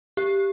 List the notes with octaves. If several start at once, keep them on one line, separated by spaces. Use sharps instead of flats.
G4